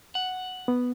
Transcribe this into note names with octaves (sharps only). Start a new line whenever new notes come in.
F#5
B3